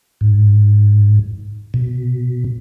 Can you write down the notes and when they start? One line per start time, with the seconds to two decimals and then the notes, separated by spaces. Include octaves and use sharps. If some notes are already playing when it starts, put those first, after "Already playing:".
0.21 G#2
1.74 B2